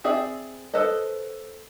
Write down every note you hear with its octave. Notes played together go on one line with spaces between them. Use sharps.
C4 G#4 D5 E5
A4 B4 C5 D#5